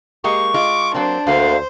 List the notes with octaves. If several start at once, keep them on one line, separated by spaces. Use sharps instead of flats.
G#3 A#3 G4 C#6
G#3 F4 D6
F#3 A#3 C4 D4 C5
D2 D3 A#3 D4 C5 F5